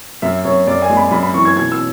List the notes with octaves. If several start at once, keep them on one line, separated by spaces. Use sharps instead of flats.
F#2 E5
F#2 C#5
F#2 D5
G#5
G#3
B5
F#2 B5
B5
E3 C#6
G#6
B2 G#6
E6